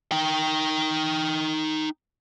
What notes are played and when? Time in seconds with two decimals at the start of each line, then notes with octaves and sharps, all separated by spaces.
0.12 D#4 G5